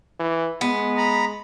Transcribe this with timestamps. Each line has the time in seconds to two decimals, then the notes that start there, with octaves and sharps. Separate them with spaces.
0.20 E3
0.61 G#3 B3
0.97 A#5 B5